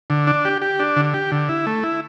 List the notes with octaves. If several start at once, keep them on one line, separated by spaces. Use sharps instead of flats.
D3
D4
G4
G4
D4
D3
G4
D3
E4
A3
E4